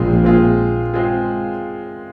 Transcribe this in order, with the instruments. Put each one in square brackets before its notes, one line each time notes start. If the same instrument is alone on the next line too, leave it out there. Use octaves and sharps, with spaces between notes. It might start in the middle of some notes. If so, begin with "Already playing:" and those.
Already playing: [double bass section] A#1 A#2 [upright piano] G#3 C4 F4 G#4
[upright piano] G#3 C4 F4 G#4
G#3 C4 F4 G#4